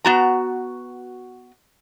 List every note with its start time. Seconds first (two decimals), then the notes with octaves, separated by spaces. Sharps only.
0.04 B3 F#4 A#5